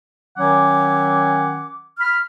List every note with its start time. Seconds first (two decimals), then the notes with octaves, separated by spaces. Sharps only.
0.37 D#3 F#3 C#4 F#5 G#5 D6
1.99 B5 F6